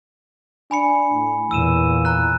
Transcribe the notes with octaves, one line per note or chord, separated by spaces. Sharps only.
D4 G#5 B5 C#7
A2
E2 A#2 E3 E6 D#7 E7
A#5 F#6